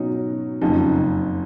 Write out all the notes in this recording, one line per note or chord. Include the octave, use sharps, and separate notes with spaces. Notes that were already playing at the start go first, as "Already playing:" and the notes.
Already playing: B2 F#3 C#4 D#4
F#1 F2 C#3 D#4